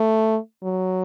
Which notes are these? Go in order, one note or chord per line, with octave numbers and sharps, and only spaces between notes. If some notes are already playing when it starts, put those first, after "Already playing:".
Already playing: A3
F#3